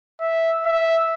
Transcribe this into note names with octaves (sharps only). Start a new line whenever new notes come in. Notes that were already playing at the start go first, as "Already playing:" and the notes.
E5
E5